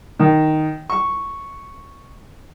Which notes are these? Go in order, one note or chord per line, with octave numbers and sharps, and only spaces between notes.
D#3
C#6